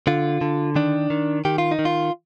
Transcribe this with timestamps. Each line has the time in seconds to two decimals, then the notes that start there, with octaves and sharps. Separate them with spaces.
0.07 D3 F4
0.41 D3
0.76 D#3 D4
1.10 D#3
1.45 D#3 G4
1.58 F4
1.71 D#4
1.79 D#3
1.85 F4